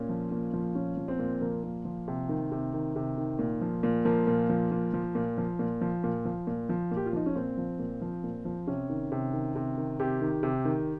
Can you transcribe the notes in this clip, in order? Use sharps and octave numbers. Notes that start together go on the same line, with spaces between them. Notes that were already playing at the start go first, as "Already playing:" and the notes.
Already playing: A#2 C#4
F3
A#2
F3
A#2 C#4
F3
C4
A#2
F3 A#3
A#2
F3
C3
D#3
C3
D#3
C3
D#3
A#2
F3
A#2
F3 A#3
A#2
F3
A#2
F3
A#2
F3
A#2
F3
A#2
F3
A#2
F3
A#2 G4
F4
F3 D#4
C#4
A#2 C4
F3
A#2
F3
A#2
F3
C3 C#4
D#3
C3
D#3
C3
D#3
C3 G4
D#3
C3
D#3